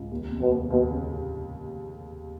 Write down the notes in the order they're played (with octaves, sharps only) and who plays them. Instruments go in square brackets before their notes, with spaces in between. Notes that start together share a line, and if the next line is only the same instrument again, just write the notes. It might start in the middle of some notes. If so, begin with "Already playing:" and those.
Already playing: [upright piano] C#2
D#2
F1
[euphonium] B2
[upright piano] D#2
[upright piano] D#2 [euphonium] B2
[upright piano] C#3